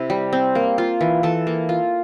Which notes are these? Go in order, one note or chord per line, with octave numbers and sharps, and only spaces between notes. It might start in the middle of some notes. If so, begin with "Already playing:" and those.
Already playing: C3 C4 E4
G3
C4
A#3
F4
E3
E3 A4 A5
A#3
F4